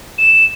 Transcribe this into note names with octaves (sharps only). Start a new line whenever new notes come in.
E7